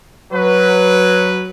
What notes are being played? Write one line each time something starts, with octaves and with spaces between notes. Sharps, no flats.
F#3 B4